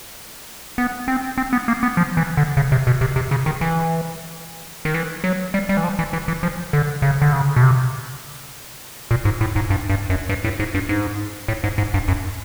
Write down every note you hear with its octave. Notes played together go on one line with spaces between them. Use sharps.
B3
C4
C4
B3
A#3
B3
F3
E3
D3
C#3
C3
B2
C3
C3
C#3
D#3
E3
D#3
E3
F#3
G3
G3
E3
F3
E3
E3
E3
F3
D3
C#3
D3
C#3
B2
C3
A#2
G#2
A2
G#2
G2
G2
F#2
G2
A2
G#2
G2
G#2
A2
G#2
G#2
G2
F#2